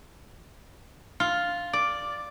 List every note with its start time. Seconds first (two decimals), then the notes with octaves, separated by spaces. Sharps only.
1.20 F4
1.73 D5